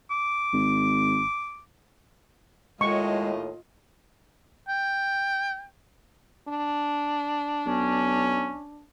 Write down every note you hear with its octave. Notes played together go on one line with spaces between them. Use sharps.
D6
G#1
D#2 A2 G#3 F4 D#5 C#6
G5
D4
B1 C#4